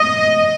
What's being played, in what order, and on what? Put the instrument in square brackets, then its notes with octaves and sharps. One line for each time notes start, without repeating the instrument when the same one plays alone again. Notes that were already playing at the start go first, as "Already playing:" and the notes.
Already playing: [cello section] D#5